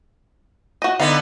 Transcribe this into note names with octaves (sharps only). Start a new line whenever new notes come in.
F#4 D#5
D3 B3 D#4 F5